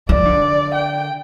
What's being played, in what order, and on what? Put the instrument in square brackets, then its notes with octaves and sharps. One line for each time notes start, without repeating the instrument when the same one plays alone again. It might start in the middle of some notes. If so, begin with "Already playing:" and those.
[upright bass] F3 [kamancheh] D5
[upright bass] D3
[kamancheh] G5